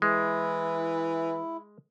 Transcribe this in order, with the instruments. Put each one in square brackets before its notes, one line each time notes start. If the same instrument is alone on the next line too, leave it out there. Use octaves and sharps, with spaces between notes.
[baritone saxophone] E3 [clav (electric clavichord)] G#3 [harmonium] E4